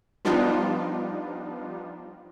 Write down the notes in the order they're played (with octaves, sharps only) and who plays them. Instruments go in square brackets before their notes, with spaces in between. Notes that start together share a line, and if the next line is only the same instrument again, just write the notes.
[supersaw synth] F3 G3 B3 D4 D#4 F4